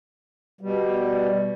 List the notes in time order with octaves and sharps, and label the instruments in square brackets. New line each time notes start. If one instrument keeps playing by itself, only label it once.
[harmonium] B2 G3